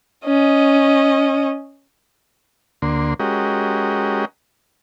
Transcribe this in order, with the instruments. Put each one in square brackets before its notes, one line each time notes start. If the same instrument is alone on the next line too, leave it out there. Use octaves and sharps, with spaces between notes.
[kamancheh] C#4 D#5
[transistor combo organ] D2 D3 A#3 C6
G#3 C#4 F#4 G4 A#4 D#5